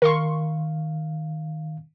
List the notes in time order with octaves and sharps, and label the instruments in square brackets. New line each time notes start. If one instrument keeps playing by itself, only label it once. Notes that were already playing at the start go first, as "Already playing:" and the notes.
[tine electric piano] D#3 F5 [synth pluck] A#4 C6 C#6